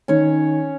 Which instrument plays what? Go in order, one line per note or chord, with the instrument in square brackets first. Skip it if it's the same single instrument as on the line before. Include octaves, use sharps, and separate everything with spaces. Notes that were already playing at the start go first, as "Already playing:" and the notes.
[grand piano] D#3 [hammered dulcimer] C#4 C#5